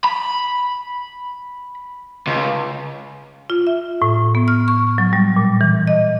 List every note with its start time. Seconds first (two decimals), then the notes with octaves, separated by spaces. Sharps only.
0.04 B5
2.28 C#2
3.50 F4
3.67 E5
4.02 A2
4.35 B3
4.48 F6
4.68 C#6
4.98 F#3
5.13 G3
5.36 A#2
5.61 E3
5.87 D#5